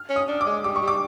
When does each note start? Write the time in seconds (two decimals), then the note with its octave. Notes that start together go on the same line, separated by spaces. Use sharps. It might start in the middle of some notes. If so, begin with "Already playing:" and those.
Already playing: F6
0.10 C#4
0.16 D#6
0.28 D4
0.41 D6
0.47 G#3
0.64 G3 D6
0.76 C#6
0.83 G3
0.88 D6